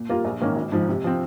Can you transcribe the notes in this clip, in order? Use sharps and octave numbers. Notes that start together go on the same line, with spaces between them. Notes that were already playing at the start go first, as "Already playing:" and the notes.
Already playing: A#2
G3 A#3 F4
A#1
G#2 D#3 A#3 C#4
G#1
G#2 F3
C3
F3 C4